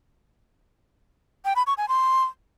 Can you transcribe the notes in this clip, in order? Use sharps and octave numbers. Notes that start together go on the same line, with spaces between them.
G5
B5
C#6
G#5
C6